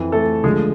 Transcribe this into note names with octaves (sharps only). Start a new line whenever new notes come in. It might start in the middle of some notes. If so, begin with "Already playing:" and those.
Already playing: F2 E3
A3 A4
D2 D3 F3 G#3 G#4